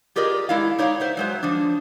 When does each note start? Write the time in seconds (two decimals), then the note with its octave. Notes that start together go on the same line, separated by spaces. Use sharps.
0.16 F4 G4 G#4 A#4 D5 D#5
0.49 G#3 E4 F5
0.79 D#4 C#5 D5 E5 F5
1.00 C5 E5 F#5
1.17 F#3 G#3 C5
1.43 F3 D4